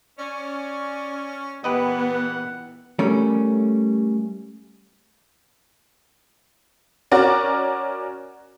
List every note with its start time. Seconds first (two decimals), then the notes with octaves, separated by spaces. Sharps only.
0.19 C#4 D5
1.64 A#2 E3 B3 G4 B4 D#5 F#5
2.99 G3 A3 C#4 A#4
7.11 C#4 F#4 A#4 D5